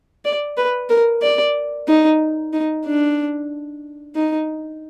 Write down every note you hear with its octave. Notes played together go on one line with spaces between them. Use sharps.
D5
B4
A#4
D5
D#4
D#4
D4
D#4